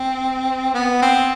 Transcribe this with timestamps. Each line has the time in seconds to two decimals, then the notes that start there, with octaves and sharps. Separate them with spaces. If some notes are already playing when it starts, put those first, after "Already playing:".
Already playing: C4
0.74 B3
1.02 C4